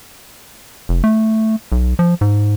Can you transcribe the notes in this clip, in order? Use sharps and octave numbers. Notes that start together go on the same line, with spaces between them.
F1
A3
B1
F3
G#2